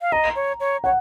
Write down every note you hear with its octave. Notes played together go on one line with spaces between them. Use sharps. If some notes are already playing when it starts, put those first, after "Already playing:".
F5
D#5 A#5
C#5
C#5
C#5 F#5